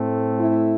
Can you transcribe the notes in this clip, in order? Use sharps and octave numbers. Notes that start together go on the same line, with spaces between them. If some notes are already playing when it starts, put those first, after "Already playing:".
Already playing: A2 A3 C4
E4